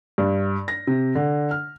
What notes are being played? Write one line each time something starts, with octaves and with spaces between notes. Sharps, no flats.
G2
A#6
C3
D3
F6